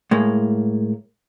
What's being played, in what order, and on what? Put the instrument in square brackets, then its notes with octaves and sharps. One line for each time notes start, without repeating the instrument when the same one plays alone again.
[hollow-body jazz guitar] A2 G#3 A#3